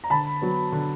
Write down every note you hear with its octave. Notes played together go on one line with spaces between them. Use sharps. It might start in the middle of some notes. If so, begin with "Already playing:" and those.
A#5
D3 A5 B5
F#3 B3
D3